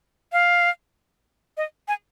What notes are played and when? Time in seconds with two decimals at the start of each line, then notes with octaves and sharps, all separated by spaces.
0.32 F5
1.57 D#5
1.88 G#5